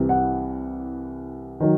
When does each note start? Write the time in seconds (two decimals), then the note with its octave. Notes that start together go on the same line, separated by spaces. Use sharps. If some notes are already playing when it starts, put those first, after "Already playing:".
Already playing: C2 C3 E3
0.09 F#5
1.60 D#3 F#3